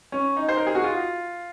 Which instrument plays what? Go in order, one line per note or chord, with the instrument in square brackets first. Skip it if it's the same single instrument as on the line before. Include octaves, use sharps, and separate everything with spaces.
[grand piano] C#4
D#4
C5
A#4
G#4
F#4
F4